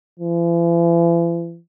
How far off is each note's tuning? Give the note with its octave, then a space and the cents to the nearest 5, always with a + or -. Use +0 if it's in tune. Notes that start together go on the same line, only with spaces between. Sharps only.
E3 +45